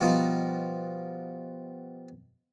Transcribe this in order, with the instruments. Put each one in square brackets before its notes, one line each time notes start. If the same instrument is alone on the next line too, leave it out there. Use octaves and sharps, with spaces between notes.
[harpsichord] B2 F3 G3 D#4 F4